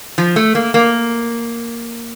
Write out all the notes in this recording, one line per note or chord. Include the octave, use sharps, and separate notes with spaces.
F3
A3
A#3
A#3